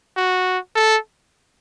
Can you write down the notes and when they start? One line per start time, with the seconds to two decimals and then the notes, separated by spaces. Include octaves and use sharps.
0.17 F#4
0.75 A4